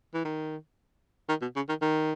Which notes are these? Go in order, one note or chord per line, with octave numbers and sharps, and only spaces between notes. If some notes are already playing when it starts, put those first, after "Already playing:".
E3
D#3
D#3
B2
C#3
D#3
D#3